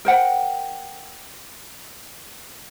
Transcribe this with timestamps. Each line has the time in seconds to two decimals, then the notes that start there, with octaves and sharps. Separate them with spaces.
0.05 A#4 C5 F#5 G5